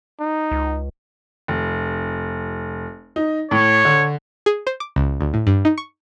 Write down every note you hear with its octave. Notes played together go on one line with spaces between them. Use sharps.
D#4
C#2
F1
D#4
A2 C#5
D3
G#4
C5
D6
C#2
D2
A2
G2
D#4
C#6